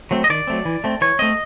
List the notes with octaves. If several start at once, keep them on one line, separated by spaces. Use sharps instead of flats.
F#3 A3 C4
D#5
D#3 D5
F#3 A3 C4
E3
A3 C4
E3 C#5
A3 C4 D#5